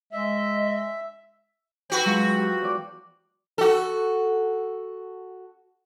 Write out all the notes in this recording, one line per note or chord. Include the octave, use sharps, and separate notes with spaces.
G#3 D#5 E5
C4 F#4 B4
F#3 G#3 F4
G4
E2 D5
F#4 A4